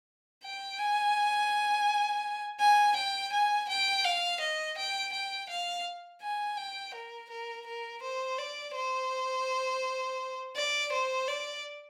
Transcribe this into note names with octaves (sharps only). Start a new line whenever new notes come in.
G5
G#5
G#5
G5
G#5
G5
F5
D#5
G5
G5
F5
G#5
G5
A#4
A#4
A#4
C5
D5
C5
D5
C5
D5